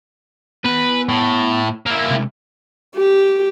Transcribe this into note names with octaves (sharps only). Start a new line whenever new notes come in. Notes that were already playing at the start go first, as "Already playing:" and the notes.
B3 B4 G#5
A2
A#3 E4
C3 G#3
G4